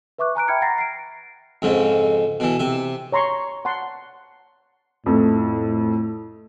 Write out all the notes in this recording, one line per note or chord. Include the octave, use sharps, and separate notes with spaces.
B4 E5 C#6 D6 F#6
G#5 A#5 F#6 D7
E5 G5 B5 F6 G#6 C#7
F#5 A#5 A6 A#6 C7
C7 D7
F2 G#2 C#3
B2 E3
C3 E5
C#5 A#5 C6 C#6
F#5 A5 C6
F2 A2 A3